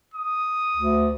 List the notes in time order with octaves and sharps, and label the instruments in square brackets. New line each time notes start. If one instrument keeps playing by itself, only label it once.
[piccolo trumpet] D#6
[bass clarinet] D2